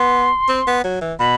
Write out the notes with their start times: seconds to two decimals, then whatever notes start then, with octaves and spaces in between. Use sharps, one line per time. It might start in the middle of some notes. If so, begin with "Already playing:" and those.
Already playing: B3 C6
0.49 C4
0.67 B3
0.84 F#3
1.01 E3
1.19 B2 B5